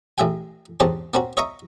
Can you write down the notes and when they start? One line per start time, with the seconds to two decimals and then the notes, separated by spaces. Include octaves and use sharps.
0.18 A1 G#3 E5 G5 G#5
0.80 E2 G#2 C4 C#4 G4 A5
1.14 A#3 C4 C#4 F#4
1.37 C#5 D#5 E5 A#5 C#6 D#6